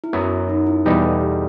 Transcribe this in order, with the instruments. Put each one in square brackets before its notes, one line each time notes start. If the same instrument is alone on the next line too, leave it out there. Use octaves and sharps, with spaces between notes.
[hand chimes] E4
[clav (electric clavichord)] F#2 F#3 B3 [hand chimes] F#4
[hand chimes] D#4
E4
[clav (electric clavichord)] E2 B2 G3 D#4 [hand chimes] B4
[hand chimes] A4
G4